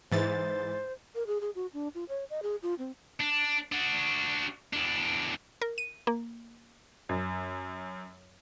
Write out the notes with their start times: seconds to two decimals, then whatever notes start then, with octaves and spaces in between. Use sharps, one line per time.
0.12 G#2 E3 C5 A6
1.15 A#4
1.27 G#4
1.41 G#4
1.55 F#4
1.74 D4
1.95 F4
2.09 C#5
2.30 D#5
2.43 G#4
2.63 F4
2.79 C4
3.21 D4
3.72 D4 F#4
4.73 E2 D4
5.62 A#4
5.78 D#7
6.07 A#3
7.09 F#2